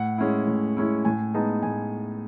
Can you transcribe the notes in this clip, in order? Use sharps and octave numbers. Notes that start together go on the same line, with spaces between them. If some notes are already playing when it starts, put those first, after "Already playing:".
Already playing: A2 F#5
G#3 C#4 E4
A2
G#3 C#4 E4
A2 G#5
G#3 B3 D#4 A5
A2 G#5